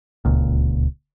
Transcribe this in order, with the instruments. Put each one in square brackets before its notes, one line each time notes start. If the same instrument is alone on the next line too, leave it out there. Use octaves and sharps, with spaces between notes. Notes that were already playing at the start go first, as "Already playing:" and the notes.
[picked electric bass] D1 C#2 A#2